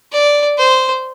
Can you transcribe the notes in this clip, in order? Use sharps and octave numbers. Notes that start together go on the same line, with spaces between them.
D5
C5